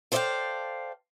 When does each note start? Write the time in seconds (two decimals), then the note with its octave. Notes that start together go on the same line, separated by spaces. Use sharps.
0.12 A4 C5 D5 D#5 F5 G5